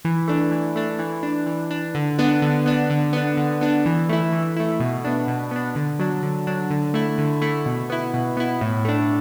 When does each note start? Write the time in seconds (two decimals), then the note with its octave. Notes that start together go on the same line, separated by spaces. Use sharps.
0.05 E3
0.28 A3 D4
0.52 E3
0.76 A3 D4
0.99 E3
1.23 D4
1.46 E3
1.71 D4
1.95 D3
2.19 B3 D4
2.42 D3
2.66 B3 D4
2.90 D3
3.13 B3 D4
3.37 D3
3.61 B3 D4
3.86 E3
4.09 A3 E4
4.32 E3
4.57 A3 E4
4.80 B2
5.05 B3 D4
5.28 B2
5.51 B3 D4
5.76 D3
5.99 F#3 D4
6.23 D3
6.47 F#3 D4
6.70 D3
6.94 A3 E4
7.18 D3
7.42 A3 E4
7.66 B2
7.90 B3 E4
8.14 B2
8.37 B3 E4
8.61 A2
8.85 A3 D4